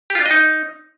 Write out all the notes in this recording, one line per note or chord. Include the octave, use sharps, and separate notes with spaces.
G4
F4
D4
D#5
D#4